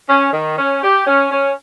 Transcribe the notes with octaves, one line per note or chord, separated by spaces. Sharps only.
C#4
D#3
C#4
G4
C#4
C#4